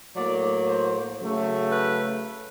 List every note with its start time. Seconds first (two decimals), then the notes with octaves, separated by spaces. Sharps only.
0.15 A2 F#3 A#3 D5
0.68 C5
1.20 C#3 F#3 A3
1.71 B4